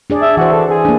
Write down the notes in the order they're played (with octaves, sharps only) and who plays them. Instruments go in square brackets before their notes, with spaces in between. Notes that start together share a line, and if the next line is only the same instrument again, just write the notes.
[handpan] D4 G#4 D5
[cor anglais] E5
[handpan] E3 C5 [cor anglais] F#4
[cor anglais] A4
G#4
[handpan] A#3 D4